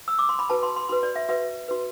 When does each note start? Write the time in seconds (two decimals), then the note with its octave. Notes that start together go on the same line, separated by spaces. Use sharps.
0.08 E6
0.19 D6
0.29 C6
0.39 B5
0.50 F#4 B4 A5
0.63 C6
0.76 C6
0.89 F#4 B4 C6
1.03 D5
1.16 E5
1.29 F#4 B4 E5
1.68 F#4 B4